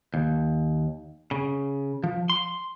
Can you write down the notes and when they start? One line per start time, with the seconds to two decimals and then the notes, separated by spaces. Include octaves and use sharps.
0.14 D#2
1.31 C#3
2.04 F3
2.30 C6